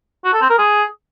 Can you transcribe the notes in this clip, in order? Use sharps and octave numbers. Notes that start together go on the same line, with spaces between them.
F#4
A4
C4
A#4
G#4